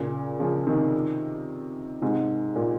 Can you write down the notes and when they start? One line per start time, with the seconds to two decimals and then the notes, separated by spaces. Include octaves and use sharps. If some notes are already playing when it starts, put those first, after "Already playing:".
Already playing: A#2 C#3
0.40 C#3 F3
0.67 C3 D#3
2.02 G#2 C3
2.56 A#2